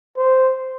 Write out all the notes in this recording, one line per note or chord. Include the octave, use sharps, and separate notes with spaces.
C5